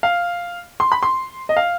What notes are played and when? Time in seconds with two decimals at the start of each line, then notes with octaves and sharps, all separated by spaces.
0.03 F5
0.80 C6
0.92 B5
1.03 C6
1.49 D#5
1.57 F5